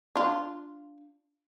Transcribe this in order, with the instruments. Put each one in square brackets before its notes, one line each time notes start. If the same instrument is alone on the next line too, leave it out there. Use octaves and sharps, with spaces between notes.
[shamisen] D4 F4